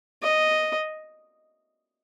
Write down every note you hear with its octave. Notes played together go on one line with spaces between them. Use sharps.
D#5